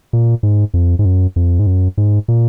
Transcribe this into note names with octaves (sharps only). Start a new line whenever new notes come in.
A#2
G#2
F2
G#2
F#2
F2
G#2
F#2
G#2
A#2